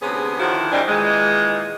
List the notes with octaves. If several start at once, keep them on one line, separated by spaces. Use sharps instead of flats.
D2 C3 B3 C#4 G#4
D3 D#3 F3 E4 F#4
D#3 E3 G3 C4 D4 D#4
A#2 D#3 E3 G#3